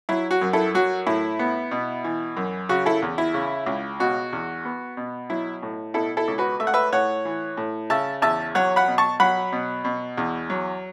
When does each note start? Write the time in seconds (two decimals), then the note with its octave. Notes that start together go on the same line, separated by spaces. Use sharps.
0.09 F#3 E4
0.31 F#4
0.41 F#2
0.53 E4 A4
0.75 F#3 F#4
1.07 A2 E4
1.39 B3
1.71 B2
2.04 E3
2.37 F#2
2.69 C#3 F#4
2.86 E4 A4
3.02 E2
3.18 E4
3.34 C#3
3.67 C#2
4.00 B2 F#4
4.33 E2
4.65 B3
4.97 B2
5.30 F#3 E4
5.63 A2
5.94 B2 E4 A4
6.17 E4 A4
6.28 C#2
6.38 F#4 B4
6.60 A3 E5
6.67 F#5
6.74 B4 E5
6.92 A2 C#5 F#5
7.25 E3
7.57 A2
7.90 C#3 E5 A5
8.22 E2 E5 A5
8.55 F#3 C#5 F#5
8.76 F#5 B5
8.88 B2
8.98 A5 C#6
9.20 F#3 F#5 B5
9.52 B2
9.85 B2
10.18 E2
10.50 F#3